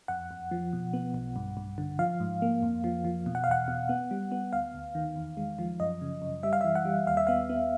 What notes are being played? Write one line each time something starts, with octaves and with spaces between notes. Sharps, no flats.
F2 F#5
F2
F3
B2
B3
B1
G2
G2
D3
F3 F5
G#2
A#3
F2
F3
F3
B2
F#5
F5
E2 F#5
B2
B3
G3
B3
D2 F5
D2
D#3
E2
G#3
F3
F#2 D#5
C#3
F#2
G3 E5
F5
E3 E5
F#5
G3
D#2 F5
E5
B3 F5
B3